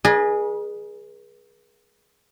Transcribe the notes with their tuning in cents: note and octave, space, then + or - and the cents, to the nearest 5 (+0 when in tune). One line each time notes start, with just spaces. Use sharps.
G#4 +0 B4 -45 D#5 -45